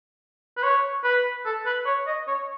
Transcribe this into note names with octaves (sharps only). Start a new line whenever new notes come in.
B4
C#5
B4
A4
B4
C#5
D#5
C#5